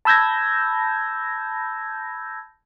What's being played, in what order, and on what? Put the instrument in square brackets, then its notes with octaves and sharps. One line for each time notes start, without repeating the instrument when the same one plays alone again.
[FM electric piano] A5 B5 E6 G6 G#6 A#6